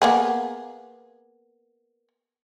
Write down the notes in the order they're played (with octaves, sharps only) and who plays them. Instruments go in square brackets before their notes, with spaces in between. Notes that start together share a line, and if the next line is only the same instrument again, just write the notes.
[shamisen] A#3 B3 G#4